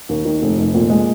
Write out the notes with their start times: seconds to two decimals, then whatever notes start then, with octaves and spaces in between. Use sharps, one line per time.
0.09 D#2
0.25 D#3
0.42 F1
0.58 F1
0.74 A#2
0.90 G#3